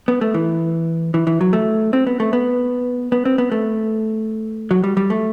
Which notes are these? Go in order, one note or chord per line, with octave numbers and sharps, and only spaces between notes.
B3
A3
E3
E3
E3
F#3
A3
C4
B3
A3
B3
B3
C4
B3
A3
F#3
G3
G3
A3